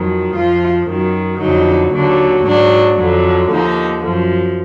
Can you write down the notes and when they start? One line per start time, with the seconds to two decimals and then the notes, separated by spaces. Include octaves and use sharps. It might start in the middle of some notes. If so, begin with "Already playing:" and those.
Already playing: F2 D#3 F#3
0.35 F2 F3 F4
0.88 F#2 D#3 F#3
1.41 F2 D3 F#3 D#4
1.93 D#2 D3 F#3
2.46 G#2 F#3 D4
2.98 F2 D3 F#3
3.51 D#2 D3 F3 D#4
4.03 F#2 F3